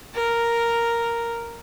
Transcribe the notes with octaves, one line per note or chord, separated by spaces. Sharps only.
A#4